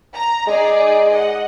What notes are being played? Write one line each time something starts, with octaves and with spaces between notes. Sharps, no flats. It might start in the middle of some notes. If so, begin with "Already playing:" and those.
A#5
G#3 D#4 G#4 D5
D#5 F#5